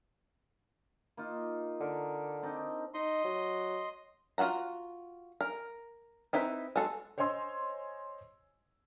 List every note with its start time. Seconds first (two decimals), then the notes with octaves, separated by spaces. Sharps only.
1.17 A#3 D#4 F4
1.81 D3 A#4
2.43 C4 D4 D#4
2.94 D#4 D#5 C6
3.24 F#3
4.38 F4 F#4 F#5 A#5
5.41 A#4
6.33 C4 D#4 E4 B4
6.76 G#3 F#4 A4
7.18 C5 C#5 D#5 G#5 C6 E6